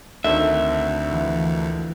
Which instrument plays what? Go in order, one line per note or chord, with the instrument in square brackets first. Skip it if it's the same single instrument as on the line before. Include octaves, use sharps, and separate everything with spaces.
[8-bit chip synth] D2 [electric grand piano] D3 D#3 C4 [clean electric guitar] E5
[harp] E3 F3